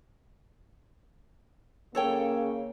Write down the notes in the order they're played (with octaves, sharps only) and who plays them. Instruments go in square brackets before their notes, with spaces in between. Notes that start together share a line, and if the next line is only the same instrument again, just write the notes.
[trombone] C#3 [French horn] A#3 [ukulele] A4 C#5 G5